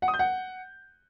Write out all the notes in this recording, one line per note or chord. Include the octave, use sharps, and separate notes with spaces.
F#5
D#6
G6
F#5